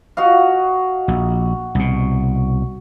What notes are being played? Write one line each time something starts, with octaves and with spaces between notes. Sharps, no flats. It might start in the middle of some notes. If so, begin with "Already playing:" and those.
F#4 D#5 F5
A#1
C2 B2